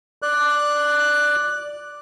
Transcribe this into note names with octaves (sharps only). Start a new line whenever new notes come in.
D5 F#6